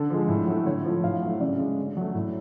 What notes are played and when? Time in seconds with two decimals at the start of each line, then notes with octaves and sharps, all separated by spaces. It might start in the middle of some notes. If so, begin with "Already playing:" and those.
Already playing: D3 A4
0.10 F3 G#3
0.28 A2
0.47 F#3 A3
0.66 D3 C#5
0.85 F3 A3
1.04 A2 F5
1.22 F#3 A3
1.40 C#3 D5
1.59 G#3
1.77 D3
1.97 F#3 A3
2.15 A2